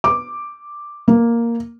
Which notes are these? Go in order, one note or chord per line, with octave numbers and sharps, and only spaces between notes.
D6
A#3